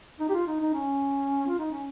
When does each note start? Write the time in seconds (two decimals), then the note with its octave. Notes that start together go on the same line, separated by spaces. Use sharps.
0.20 D#4
0.29 G4
0.34 F4
0.47 D#4
0.60 D#4
0.74 C#4
1.47 F4
1.59 D#4
1.71 C#4